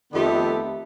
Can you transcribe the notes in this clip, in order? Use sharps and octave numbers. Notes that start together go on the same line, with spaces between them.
F2 D#3 A3 B3 G4